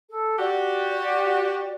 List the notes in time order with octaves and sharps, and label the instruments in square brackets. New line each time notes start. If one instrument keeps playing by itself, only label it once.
[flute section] A4
[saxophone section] F#4 G4 [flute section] D5